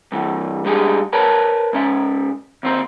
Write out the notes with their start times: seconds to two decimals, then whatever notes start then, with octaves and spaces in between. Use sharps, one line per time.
0.12 G2 E3
0.64 G2 G#3 D4 G4 G#4 G#5
1.13 A#4 B4 C#5 A5
1.73 G#2 C#4 E5
2.63 D#2 C4 C5